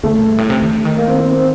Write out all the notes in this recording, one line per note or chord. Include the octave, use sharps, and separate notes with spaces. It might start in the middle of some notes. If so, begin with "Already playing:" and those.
D3 A3
A#2
G2
A2
C3
D#3
D3
D#3
A#3
C4
C4
C4